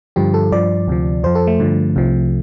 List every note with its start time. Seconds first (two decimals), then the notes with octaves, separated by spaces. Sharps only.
0.16 G2 D3 F3 G4
0.34 A4
0.52 G2 F3 D5
0.88 D2 C3 F3
1.23 F2 F3 C5
1.35 A4
1.47 A3
1.60 G2 D3 F3
1.96 C2 C3 F3